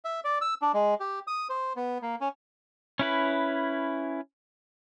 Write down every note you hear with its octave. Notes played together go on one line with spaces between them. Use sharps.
E5
D5
E6
D4
G#3
G4
D#6
C5
B3
A#3
C#4
C#4 E4 B4